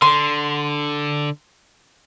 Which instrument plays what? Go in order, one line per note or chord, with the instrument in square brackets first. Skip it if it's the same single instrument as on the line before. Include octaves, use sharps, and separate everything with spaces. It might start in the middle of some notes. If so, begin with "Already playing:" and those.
[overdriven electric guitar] D3 [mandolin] C6